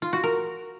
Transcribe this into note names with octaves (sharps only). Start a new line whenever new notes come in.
F4
F#4
A#4